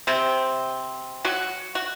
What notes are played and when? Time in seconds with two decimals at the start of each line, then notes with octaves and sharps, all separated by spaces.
0.07 C3 C4
1.25 F#3 F#4
1.75 F#4